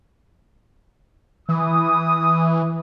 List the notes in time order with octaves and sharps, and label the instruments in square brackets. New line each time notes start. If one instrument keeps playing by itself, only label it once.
[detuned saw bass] E3 [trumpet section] D#6